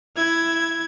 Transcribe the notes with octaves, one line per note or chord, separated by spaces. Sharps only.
E4 G#6